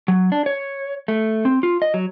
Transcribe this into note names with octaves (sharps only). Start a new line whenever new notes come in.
F#3
D4
C#5
A3
C4
F4
D#5
F#3